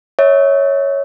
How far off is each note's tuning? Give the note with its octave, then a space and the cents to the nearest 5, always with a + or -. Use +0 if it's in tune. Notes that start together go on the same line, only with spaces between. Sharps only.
C#5 +0 E5 -35